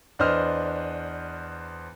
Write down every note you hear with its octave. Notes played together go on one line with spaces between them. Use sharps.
E2 D4 B4 C5 D#5 F6